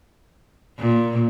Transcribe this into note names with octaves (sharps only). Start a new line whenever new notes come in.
A#2